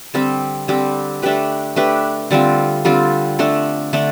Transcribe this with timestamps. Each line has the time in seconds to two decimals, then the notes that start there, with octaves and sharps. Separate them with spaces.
0.14 D3 G3 C4 G4
0.68 D3 G3 C4 G4
1.22 A3 D4 G4 B4
1.76 A3 D4 G4 B4
2.31 D3 G3 C4 F4
2.85 D3 G3 C4 F4
3.39 D3 A3 D4
3.93 D3 A3 D4